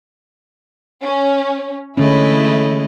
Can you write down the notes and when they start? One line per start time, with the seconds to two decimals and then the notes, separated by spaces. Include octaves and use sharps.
1.03 C#4
1.97 D3 E3 G#3 A3 C#4 E4 D#5